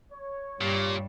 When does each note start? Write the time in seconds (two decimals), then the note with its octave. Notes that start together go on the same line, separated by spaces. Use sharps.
0.11 C#5
0.61 G2 A#2 G4